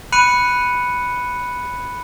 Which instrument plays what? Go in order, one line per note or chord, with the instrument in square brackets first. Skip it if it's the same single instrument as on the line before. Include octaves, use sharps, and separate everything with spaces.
[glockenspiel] B5 F#6 C#7 D#7